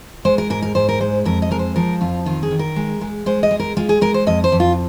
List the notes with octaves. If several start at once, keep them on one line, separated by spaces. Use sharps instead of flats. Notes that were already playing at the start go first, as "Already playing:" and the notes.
G#3 C5
A#4
G#2 A#4
A#4
G#2 C5
A#4
G#3 C5
F2 A#4
D#5
G#3 A#4
C5
F3 A#4
F2 F4
D#3 F4
G#4
D#3
A#4
G#3
G#3
G#3 C5
D#5
G#3
A#4
G#3 F4
G#4
G#3 A#4
C5
F2 D#5
C5
F2
F4